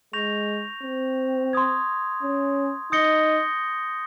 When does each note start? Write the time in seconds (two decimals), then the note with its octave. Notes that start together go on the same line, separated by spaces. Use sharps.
0.13 G#3 C#6 G6 A#6 F7
0.83 C4
1.53 C6 D#6 G#6
2.23 C#4
2.92 D#4 D#6 G6 A#6 C#7 G7